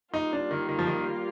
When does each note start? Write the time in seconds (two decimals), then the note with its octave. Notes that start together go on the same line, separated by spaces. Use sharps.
0.14 G3 A#3 D#4 F4
0.33 D4
0.51 D#3
0.69 D#3
0.79 F3
0.87 D#3